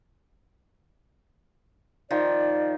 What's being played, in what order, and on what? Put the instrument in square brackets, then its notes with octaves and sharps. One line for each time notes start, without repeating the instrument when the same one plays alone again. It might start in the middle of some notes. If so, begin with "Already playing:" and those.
[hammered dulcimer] D#3 F3 [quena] D5